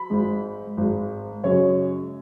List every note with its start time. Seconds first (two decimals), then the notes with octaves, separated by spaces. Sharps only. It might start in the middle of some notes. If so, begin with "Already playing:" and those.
Already playing: B5
0.10 G#1 G#2 G#3
0.77 G#1 G#2 G#3
1.43 F#2 C#3 G#3 C#5